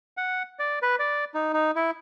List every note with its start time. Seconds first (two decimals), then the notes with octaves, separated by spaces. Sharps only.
0.17 F#5
0.59 D5
0.82 B4
0.99 D5
1.34 D#4
1.53 D#4
1.76 E4